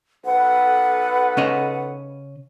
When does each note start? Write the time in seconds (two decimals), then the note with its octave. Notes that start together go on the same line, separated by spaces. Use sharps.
0.26 B1 A4 B4 F#5
1.37 C#3 C#4 D#5